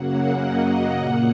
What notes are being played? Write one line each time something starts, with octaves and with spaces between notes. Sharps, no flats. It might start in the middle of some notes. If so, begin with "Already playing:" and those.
Already playing: F#2 C#3 F#3 A#3 F#5
D#5
A#2 A#3 F#5